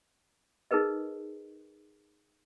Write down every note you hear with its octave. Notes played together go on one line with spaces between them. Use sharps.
D#4 G#4 A#4 B4 D#5